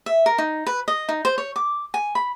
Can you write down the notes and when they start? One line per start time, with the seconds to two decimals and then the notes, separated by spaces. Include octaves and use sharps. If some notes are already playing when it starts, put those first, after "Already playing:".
0.06 E5
0.26 A#4
0.38 D#4
0.66 B4
0.88 D#5
1.09 D#4
1.25 C5
1.38 C#5
1.56 D6
1.94 G#5
2.15 B5